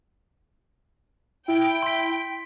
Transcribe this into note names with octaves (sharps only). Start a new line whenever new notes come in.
E4 G5
C6 B6